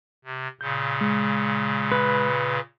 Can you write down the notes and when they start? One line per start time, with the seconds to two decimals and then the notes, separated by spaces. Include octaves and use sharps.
0.24 C3
0.61 A#2 C#3 G6
1.01 G#3
1.92 B4